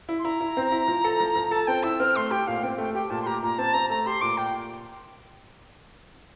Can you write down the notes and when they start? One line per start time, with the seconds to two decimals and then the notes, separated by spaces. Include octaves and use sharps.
0.09 E4
0.19 C6
0.25 E4 A#5
0.41 E4
0.57 C4
0.72 E4
0.88 F3
1.04 A4
1.20 F3
1.36 F3
1.51 A4 A5
1.67 C4 G5
1.83 E4 E6
1.99 C4 F6
2.16 A3 C6
2.31 G4 G5
2.47 A#2 F5
2.63 C4 G5
2.78 A3 G5
2.94 G4 G5
3.10 A#2 A5
3.22 C6
3.26 G4 A#5
3.43 A#2 A#5
3.58 C4 A5
3.73 C4 A#5
3.90 A3 A#5
4.06 G4 C6
4.21 A#2 D6
4.37 A#2 G5